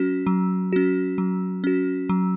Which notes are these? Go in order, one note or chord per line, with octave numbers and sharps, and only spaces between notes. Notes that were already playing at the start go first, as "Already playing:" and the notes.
Already playing: F#3 C#4 F#4
F#3
C#4 F#4
F#3
C#4 F#4
F#3